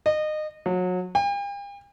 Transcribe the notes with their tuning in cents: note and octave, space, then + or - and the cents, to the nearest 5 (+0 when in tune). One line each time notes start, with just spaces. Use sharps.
D#5 -25
F#3 -30
G5 +45